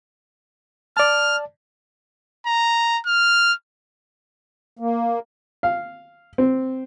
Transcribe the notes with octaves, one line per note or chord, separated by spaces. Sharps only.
D5 A5 F6
A#5
F6
A#3
F5
C4